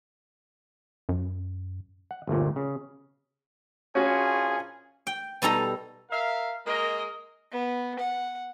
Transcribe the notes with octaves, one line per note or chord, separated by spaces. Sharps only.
F#2
F#5
G1 D2 A#2
C#3
A#1 C#4 F4 F#4 G#4
G5
B2 G3 D#4 A4 A#5
A#4 E5 F5
G#3 A#3 A#4 D#5
B3
F#5